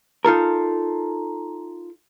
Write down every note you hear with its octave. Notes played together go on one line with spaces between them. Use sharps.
D#4 F4 A4 A#4